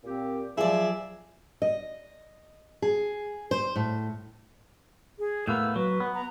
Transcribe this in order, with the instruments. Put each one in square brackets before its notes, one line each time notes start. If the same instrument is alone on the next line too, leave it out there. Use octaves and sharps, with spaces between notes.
[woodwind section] A#2 C4 G4
[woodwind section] F3 F#3 [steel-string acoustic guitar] G#4 D5 [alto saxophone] E5
[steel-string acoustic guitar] D#5
G#4
C5
A2
[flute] G#4
[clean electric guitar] A2 A#3 B3 [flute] E6
[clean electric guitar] F#3 [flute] B4
[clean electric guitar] B3
[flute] A#5